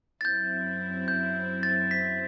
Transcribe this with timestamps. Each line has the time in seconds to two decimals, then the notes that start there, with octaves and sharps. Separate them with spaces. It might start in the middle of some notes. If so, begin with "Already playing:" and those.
0.21 A6
0.25 F#2 F#3 C4 E4 G6
1.08 G6
1.63 A6
1.91 B6